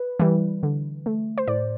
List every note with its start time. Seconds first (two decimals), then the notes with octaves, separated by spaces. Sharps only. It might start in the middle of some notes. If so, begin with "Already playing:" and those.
Already playing: B4
0.20 E3 G3
0.63 D3
1.06 A3
1.38 C5
1.47 A2 D5